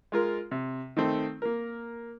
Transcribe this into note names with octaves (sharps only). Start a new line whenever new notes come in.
G#3 F4 A#4
C3
D#3 A3 C4
A#3 A#4